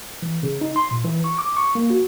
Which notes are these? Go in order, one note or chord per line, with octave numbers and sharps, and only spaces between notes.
E3
C#3
D#4
C6
A#2
E3
C#6
D6
C#6
A#3
F#4